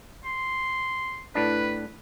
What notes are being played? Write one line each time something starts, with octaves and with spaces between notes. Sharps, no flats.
C6
A2 D4 B4